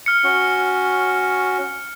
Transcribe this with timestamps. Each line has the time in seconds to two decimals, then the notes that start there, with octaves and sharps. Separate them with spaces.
0.06 F6 C#7
0.24 C#4 F#4